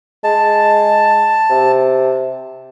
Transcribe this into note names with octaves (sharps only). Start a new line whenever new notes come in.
G#3 A5
C3